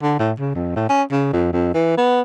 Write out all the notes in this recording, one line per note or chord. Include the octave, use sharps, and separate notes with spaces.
D3
A2
C#3
F2
A2
C#4
C#3
F2
F2
E3
B3